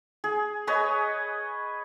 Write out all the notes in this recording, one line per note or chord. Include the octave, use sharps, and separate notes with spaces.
G#4
G#4 B4 C#5 D#5